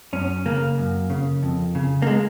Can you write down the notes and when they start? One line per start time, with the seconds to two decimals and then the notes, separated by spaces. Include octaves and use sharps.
0.13 F#2 C#4
0.46 C#3 A#3
0.78 F#2
1.10 C#3
1.43 F2
1.75 C#3
2.02 A#3
2.07 G#3